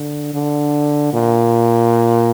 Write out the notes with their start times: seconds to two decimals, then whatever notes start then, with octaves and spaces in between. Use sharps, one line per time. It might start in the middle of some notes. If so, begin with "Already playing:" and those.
Already playing: D3
0.34 D3
1.13 A#2